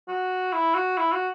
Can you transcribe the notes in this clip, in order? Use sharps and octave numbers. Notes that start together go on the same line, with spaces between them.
F#4
E4
F#4
E4
F#4